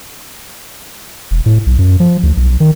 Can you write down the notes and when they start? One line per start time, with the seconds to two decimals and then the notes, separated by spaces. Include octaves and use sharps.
1.31 E1
1.46 A2
1.66 B1
1.79 F#2
2.00 F3
2.23 D2
2.37 B1
2.60 D#3